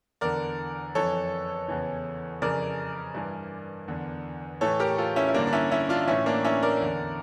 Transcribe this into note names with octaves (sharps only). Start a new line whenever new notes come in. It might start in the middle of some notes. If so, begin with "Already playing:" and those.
E2 D3 A#4 D5
F2 E3 A4 C#5
E2 C#3 E3
F2 C#3 E3 A#4 D5
G2 E3
E2 D3
A2 E3 A4 C#5
G4 A#4
F4 A4
C#4 E4
E4
G2 D3 A#3 D4
D4
C#4 E4
C#4 E4
D4 F4
A2 E3 C#4 E4
A#3 D4
C#4 E4
A#4 D5
E2 D3